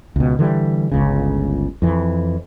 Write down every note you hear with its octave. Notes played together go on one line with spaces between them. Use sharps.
C#2 B2
D3 E3 G3
G1 C#2 C#3
F2 E3